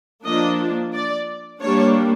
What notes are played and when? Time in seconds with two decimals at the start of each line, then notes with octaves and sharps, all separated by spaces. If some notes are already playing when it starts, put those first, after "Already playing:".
0.25 F3 A#3 D4 D#5
0.93 D5
1.61 G3 A#3 D4 C#5